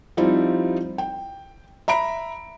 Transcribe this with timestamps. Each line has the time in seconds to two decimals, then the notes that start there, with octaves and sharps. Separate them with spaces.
0.17 F3 G3 C4 D#4 E4
0.98 G5
1.88 E5 A#5 B5 D7